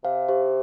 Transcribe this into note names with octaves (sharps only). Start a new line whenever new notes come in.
C3 C5 F5
G4 C5